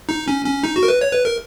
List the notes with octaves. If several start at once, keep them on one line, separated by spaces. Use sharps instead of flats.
D#4
C#4
C#4
D#4
F#4
A#4
B4
C#5
B4
A#4